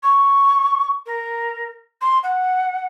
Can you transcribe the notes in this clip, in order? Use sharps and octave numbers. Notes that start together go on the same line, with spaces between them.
C#6
A#4
C6
F#5